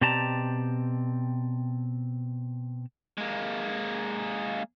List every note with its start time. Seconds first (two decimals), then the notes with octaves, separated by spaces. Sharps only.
0.01 B2 C4 G4 D5 A5 A#5
3.18 G#3 A#3